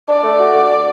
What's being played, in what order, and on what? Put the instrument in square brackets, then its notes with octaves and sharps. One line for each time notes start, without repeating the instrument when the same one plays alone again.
[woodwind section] D4 [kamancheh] D5
[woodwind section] A3
F#4
D2